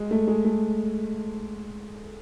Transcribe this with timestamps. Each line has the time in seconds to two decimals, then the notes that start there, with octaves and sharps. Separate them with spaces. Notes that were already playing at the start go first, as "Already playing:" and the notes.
Already playing: G#3
0.11 A3
0.28 G#3
0.45 A3